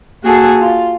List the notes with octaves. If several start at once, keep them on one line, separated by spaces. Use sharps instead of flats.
A#3 F#4 G#4 A4
F4